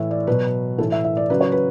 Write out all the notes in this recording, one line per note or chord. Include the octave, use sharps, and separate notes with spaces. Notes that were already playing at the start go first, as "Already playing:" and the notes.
Already playing: A2 E3 E5
D5
B2 F#3 B4
A2 E3 A4
E5
E5
D5
C#3 F#3 B4
C#5
B4